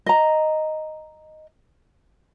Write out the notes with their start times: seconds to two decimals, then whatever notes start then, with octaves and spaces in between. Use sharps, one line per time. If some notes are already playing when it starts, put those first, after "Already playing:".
0.06 D#5 A#5